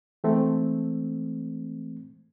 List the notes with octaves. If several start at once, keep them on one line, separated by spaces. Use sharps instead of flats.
E3 G#3 A3 C4